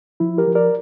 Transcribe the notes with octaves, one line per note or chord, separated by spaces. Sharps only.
F3 E4
G4 A#4
F3
A#4 D5